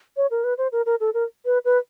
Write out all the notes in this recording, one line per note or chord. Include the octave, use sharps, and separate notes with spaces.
C#5
A#4
B4
C5
A#4
A#4
A4
A#4
B4
B4